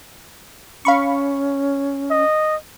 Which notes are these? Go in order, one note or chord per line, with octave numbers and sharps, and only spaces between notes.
C#4 F5 B5 C#6
D#5